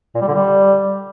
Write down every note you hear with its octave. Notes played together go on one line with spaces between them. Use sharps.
A#2
G3
D3
G3